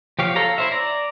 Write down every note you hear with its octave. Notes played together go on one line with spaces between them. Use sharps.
F3 G4 C#5 F5
A4 C#5 F5 A#5
E4 C5 E5
D5 A#5